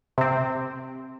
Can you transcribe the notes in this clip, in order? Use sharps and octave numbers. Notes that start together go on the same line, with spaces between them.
C3 C4